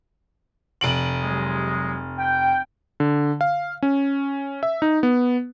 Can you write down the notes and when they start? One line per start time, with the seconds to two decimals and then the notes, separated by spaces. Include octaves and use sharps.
0.81 F1 D7 F#7
1.22 C3 F#3 G#3
2.19 G5
3.00 D3
3.41 F5
3.82 C#4
4.63 E5
4.82 D#4
5.03 B3